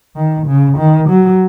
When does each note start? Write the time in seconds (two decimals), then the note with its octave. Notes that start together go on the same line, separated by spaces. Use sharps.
0.16 D#3
0.47 C#3
0.78 D#3
1.09 F#3